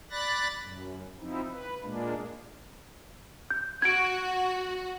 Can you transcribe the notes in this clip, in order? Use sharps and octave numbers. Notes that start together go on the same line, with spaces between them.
D5 B5 F#6 A6 A#6
F#2
F3 C4 D#4 E4
B4
A#2 G#3 A#3 D4
G6
F#4 G#6 D7